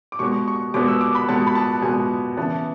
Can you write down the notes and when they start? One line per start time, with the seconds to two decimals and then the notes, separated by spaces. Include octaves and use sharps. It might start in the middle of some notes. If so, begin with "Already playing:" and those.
0.12 D6
0.19 B2 G#3 B3 C#6
0.48 C#6
0.74 B2 G#3 B3 D6
0.88 E6
1.01 D6
1.15 B5
1.28 B2 G#3 B3 A5
1.47 B5
1.55 A5
1.82 B2 G#3 B3 G#5
2.37 C#3 E3 B3 A5